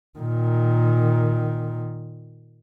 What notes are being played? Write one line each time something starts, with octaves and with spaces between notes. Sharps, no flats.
A#2 D#3